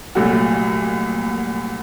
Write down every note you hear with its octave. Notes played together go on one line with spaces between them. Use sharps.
C2 A#2 F#3 A3 F#4